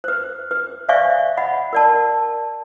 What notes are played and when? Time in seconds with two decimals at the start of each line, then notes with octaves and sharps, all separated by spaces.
0.04 B4 C5
0.51 B4
0.89 C5 D5 E5 F5 G#5 C#6
1.37 D#5 F#5 B5
1.73 A#4 D5 A5